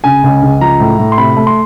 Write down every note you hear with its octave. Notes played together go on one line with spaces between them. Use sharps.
C#3 G#5
C#2
C#2
F3 A#5
A2
A2
C6
C3 B5
A3
C6